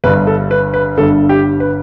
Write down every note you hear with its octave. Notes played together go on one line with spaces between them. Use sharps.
G1 G2 D3 B4
A4
B4
B4
G1 G2 D3 A4
G4
B4